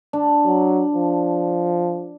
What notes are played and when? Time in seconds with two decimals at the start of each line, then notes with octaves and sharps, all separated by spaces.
0.13 D4
0.45 F#3
0.94 F3